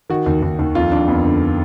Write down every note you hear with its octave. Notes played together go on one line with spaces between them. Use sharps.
D#3 F#4
D#2
D#2
D#2
F2 F4
F2 D4
F2 B3
D3